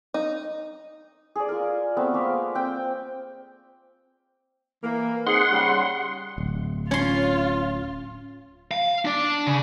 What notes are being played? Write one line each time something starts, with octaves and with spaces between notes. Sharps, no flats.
D#4
G#4 D5
F4 A#4
A3 B3 C4
G#3 A#3 B4 F5
C4 G5
E3 A#3
C4 D#4 G#4 F#5 C6
C#3 G3
D1
C#4 F4 C6
F5
D4 D5
C#3